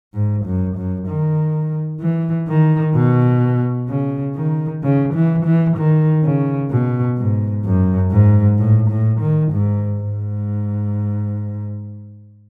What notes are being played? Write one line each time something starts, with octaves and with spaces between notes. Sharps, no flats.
G#2
F#2
F#2
D#3
E3
D#3
B2
C#3
D#3
C#3
E3
E3
D#3
C#3
B2
G#2
F#2
G#2
A2
A2
D#3
G#2
G#2